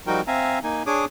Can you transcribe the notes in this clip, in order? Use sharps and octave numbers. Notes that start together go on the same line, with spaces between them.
F3 G3 D#4 F#4 A#4 G5
C4 E5 F5 G#5 A#5
A#3 D#4 G#5
D4 G#4 C#5 D6 D#6